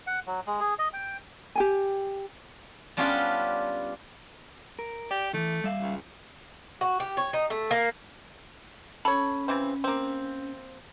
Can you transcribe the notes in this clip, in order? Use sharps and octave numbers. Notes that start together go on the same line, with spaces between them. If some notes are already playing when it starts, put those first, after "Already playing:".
F#5
F#3
G#3
G#4
D#5
G5
G4 G5 G#5
G3 B3 C#4 D4 F4 G4
A#4
G4 D5
D#3 E3 A3
G3 E5 F5
C#2
F#4
G4
C#5
D#4
A3
A#3
C#4 A4 C#5 B5
C#3 E3 C4
A#3 C4